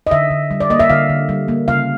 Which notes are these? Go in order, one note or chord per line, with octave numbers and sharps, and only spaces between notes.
D#5
D3 E5
D3
G3
D5
A#3 D#5
E5
D3 F5
D3
G3
A#3
C#3 F5